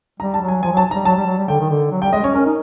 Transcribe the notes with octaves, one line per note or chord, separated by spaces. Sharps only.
G3 A#5
A5
F#3
G#5
F3 G#5
F#3 A5
G3 A#5
F#3 A5
G3
F#3
G3
D3 G5
D#3
D3
F#3
G3 G5
G#3 D#5
C#4 C#5
C#4 A#4
D#4